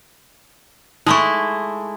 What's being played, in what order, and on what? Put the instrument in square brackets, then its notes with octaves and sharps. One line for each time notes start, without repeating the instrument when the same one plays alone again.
[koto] G#3 A3 E4 [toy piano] D#4 C#6